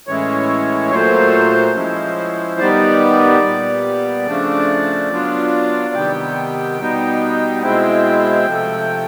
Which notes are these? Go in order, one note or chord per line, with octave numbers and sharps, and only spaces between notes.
A2 E3 G#3 C#4 E4 C#5
A#2 F#3 A3 C5
F3 G#3 C#4 E4
D#3 G3 B3 D5
A#2 G3 B3
C#3 F3 A3 D4
F#3 B3 D4 F4
C3 D#3 G3 B3 G5
B2 G3 B3 D#4
B2 G#3 C4 E4 G5
C3 F3 A3